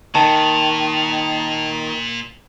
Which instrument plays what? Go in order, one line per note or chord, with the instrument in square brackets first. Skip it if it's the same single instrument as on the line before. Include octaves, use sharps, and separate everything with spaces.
[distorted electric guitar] A#2 [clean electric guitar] D#3 [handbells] A5